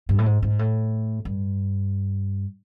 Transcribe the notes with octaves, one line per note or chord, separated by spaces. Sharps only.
G2
A2
G#2
G#2
A2
G2